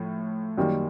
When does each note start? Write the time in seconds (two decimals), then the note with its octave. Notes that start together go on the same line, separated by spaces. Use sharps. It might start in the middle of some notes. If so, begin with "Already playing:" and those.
Already playing: A2 F3
0.58 F#2 D#3 G3 A#3